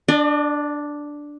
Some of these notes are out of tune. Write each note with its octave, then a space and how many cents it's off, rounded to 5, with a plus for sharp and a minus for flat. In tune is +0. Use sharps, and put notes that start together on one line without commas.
D4 +0 D5 +45